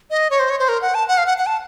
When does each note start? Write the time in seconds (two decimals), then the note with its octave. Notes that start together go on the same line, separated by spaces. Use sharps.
0.11 D#5
0.30 C#5
0.40 C5
0.50 C#5
0.59 C5
0.69 A#4
0.82 F#5
0.95 A5
1.08 F#5
1.18 F5
1.26 F#5
1.38 F#5
1.46 A5